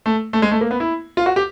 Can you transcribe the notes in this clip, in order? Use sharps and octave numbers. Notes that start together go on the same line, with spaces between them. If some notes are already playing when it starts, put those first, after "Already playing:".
A3
A3
G#3
A3
A#3
B3
E4
F4
F#4
G4